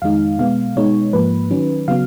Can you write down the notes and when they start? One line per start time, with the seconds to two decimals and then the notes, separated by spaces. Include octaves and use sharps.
0.02 F2 D#3 G#3 D#4 F5
0.39 B2 G#3 B3 F5
0.76 B2 G#3 B3 D#4 C#5
1.13 G#2 F3 A#3 B4
1.50 D#3 F#3 C#4
1.88 C#3 F#3 B3 F5